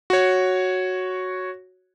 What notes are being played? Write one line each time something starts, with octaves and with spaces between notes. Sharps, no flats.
F#4 C#5